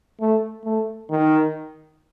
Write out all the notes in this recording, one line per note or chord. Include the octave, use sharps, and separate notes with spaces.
A3
A3
D#3